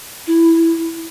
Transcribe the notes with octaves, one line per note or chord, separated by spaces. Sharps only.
E4